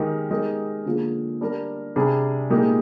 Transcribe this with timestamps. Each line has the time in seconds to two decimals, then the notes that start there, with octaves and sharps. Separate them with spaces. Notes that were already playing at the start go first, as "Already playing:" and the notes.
Already playing: D#3 G#3 D#4 G4 A#4
0.31 G#3 D#4 G4 A#4
0.86 D3 F3 A#3 F4 G#4
1.41 G3 D4 G4 A#4
1.96 C3 G3 D4 G#4
2.50 A#2 G#3 D#4 G4 A#4